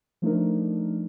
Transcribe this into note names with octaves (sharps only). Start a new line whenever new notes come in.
F3 A3 D4 D#4 A#4